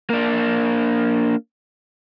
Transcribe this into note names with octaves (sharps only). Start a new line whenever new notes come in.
A#3 D4